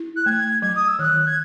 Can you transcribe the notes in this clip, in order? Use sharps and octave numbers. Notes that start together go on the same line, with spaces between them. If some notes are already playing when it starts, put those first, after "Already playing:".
Already playing: E4
F#6
A3 G#6
F#3 G#6
D#6
E6
D#3 F#6
G#6